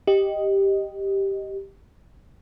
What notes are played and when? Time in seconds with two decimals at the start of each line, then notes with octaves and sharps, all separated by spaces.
0.07 G4 D#5